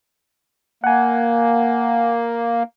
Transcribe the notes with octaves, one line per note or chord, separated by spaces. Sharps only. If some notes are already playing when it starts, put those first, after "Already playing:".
A#3 F#5 G#5